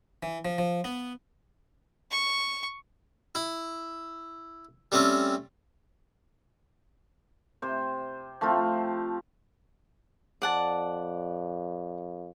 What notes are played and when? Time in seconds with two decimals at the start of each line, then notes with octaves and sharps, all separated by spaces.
0.23 E3
0.45 F3
0.58 F3
0.84 B3
2.11 C#6
3.35 E4
4.92 G3 A3 C4 C#4
7.62 C3 C5
8.41 F3 A3 C4 F4
10.42 F2 D5 F#5 A5